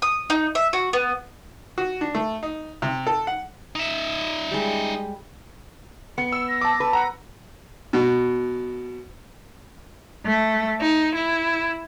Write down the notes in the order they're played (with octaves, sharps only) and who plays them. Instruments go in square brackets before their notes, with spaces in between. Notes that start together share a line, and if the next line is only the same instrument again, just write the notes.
[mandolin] D#6
D#4
E5
F#4
B3
[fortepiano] F#4
D4
A3
D#4
C3
A4
F#5
[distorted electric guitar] D#4 E5
[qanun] G3 G#3
[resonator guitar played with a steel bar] B3 [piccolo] C#7
[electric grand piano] E6
[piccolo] A#6
[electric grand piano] A5 D6
[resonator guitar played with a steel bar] B4
[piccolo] F#5 [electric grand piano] A#5
[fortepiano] B2
[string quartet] A3
D#4
E4